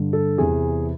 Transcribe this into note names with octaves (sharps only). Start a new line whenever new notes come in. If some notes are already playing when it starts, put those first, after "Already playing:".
Already playing: G2 D3
A4
E2 C3 E3 G#4